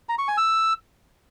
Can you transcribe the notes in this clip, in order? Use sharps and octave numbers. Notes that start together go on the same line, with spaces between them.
A#5
C#6
G#5
E6